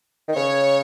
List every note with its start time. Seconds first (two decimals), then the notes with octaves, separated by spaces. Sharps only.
0.28 D#3
0.36 C#3 C#5